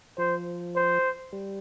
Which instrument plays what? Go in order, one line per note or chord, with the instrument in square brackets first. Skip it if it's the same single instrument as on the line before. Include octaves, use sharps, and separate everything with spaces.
[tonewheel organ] F3 [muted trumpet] C5
[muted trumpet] C5
[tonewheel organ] G3